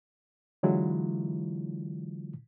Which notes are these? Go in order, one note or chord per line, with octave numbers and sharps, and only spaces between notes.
D3 E3 F#3 G#3 E4 F4